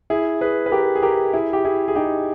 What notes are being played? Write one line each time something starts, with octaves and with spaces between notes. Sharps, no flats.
E4 G#4
G#4 B4
B4
G4 A#4
G#4
G4 A#4
E4 G#4
G4
E4 G#4
G#4
D#4 G4